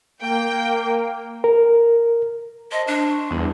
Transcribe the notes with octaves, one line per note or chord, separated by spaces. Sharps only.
A#3 G5
A#4
C5 D#5 A5 C6
D4
C#6
E2 G3 B3 D4